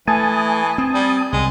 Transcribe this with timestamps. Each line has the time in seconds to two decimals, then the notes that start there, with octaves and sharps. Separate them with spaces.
0.08 E3 A3 G#5 A5 D#6
0.78 C4
0.95 G3
1.32 C2 G#3